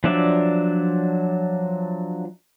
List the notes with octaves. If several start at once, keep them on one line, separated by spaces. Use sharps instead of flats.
F3 F#3 D4 D5 E5